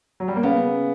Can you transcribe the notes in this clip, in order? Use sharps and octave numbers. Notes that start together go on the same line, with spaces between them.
F#3
G3
A#3
C#3 B3